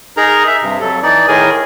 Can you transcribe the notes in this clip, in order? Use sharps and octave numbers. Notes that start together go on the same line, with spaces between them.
D#4 G#4 A#4 A#5
E5
G2 C3
F2 F#3 A4
E3 D#4 D5
A2 D#3 G#4 A#4 G#5